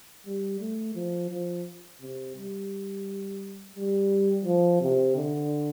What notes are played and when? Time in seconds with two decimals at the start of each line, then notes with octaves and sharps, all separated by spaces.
0.26 G3
0.60 A3
0.95 F3
1.30 F3
2.01 C3
2.36 G3
3.76 G3
4.45 F3
4.81 C3
5.16 D3